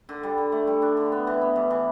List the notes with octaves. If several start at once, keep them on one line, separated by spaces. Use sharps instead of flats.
D3
G3
D3
A3
G3
D4
D3
B3
E3
B3
G2
E3